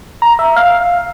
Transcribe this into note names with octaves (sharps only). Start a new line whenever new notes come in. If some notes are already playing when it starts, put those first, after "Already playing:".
A#5
E5
F5